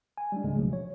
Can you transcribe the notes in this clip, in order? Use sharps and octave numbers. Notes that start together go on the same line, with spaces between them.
G#5
G3 G#3 D4
C#2 G#2 C#3 G#3 A3
B2 F3 F#3
C#5